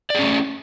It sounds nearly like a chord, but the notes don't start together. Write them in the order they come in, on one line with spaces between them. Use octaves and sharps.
D5 G#4 C#4 A3